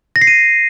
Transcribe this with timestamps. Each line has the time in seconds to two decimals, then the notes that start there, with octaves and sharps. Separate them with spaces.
0.16 A#6
0.21 C7
0.27 D#7